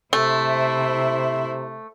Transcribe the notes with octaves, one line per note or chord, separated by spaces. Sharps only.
C3 A3 E4 C5 E5